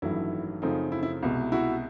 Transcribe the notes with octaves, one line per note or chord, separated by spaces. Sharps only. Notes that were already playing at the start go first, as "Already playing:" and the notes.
A1 G2 D#3 F#3 A3 E4
F#2 C#3 F3 A3 C4 D#4
E4
E4
C2 B2 G#3
E4 F#4